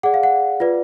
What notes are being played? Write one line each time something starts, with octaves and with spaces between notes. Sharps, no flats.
G#4 D5 F#5
F5
F#5
F4 B4 D5